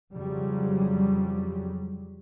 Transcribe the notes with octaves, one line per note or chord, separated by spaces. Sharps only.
F2 C#3 F#3 G3